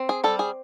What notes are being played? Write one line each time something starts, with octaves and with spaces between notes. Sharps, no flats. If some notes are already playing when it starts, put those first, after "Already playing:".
Already playing: C4
G#4
G3 A4
G#4